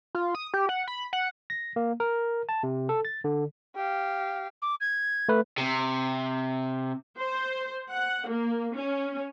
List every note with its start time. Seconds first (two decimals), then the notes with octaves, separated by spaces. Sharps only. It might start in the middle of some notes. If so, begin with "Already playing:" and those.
0.15 F4
0.35 D#6
0.54 G4
0.69 F#5
0.88 B5
1.13 F#5
1.50 A#6
1.76 A#3
2.00 A#4
2.49 A5
2.63 C3
2.89 A4
3.05 A6
3.24 D3
3.76 G4 F5
4.62 D6
4.81 G#6
5.29 A3 B4
5.58 C3
7.20 C5
7.91 F#5
8.27 A#3
8.76 C#4